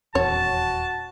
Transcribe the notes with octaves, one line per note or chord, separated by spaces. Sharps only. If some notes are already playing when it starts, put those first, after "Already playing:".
D#1 E2 C#4 F#4 C#5 A5